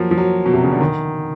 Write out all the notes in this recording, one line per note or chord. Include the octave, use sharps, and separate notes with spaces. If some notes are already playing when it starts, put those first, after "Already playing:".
Already playing: F3 F#3 A#3
F3
F#3
B2
C3
C#3
D3
D#3